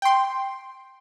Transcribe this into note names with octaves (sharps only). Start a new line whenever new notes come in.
G5 C6